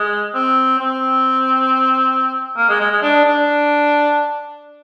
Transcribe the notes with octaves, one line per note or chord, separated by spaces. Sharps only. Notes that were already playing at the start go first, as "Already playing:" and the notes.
Already playing: G#3
C4
C4
A#3
G#3
G#3
G#3
D4
D4